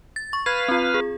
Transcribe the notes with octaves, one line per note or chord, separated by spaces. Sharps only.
A6
C#6
B4 F5 G#6
C4 F4
G#4